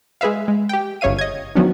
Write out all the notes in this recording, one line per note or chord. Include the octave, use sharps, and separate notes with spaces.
G#3 G#4 B4 E5 F5
G#3
G4 G5
G1 C#3 C#5 E5 F5 D#7
D#5 G#6
D#3 F3 F#3 B3 C#4 D4